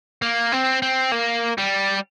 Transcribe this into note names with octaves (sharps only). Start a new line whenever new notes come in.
A#3
C4
C4
A#3
G3